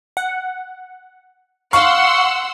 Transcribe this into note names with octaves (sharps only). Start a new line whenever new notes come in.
F#5
F5 F#5 C6 C#6 E6